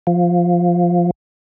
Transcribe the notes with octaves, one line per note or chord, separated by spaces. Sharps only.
F3